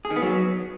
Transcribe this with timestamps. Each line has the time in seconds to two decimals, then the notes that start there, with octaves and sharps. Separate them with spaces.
0.05 G#4
0.10 D#3
0.16 B3
0.22 F#3